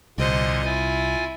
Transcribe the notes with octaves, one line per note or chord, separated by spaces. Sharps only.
C2 A#2 D3 C5 D#5
E4 F4 G#5